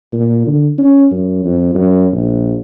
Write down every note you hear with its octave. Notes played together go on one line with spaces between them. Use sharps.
A#2
D3
C#4
F#2
F2
F#2
A#1